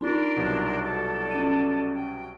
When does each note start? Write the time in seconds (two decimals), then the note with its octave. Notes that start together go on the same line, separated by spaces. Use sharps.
0.01 C4 D4 D#4 F4 A#4 C6
0.36 C2 B2 F#3
0.82 A4 D5 A5
1.31 C#4 D#7
1.93 G5